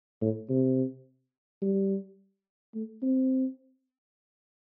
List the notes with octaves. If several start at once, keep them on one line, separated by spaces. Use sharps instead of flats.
A2
C3
G3
A3
C4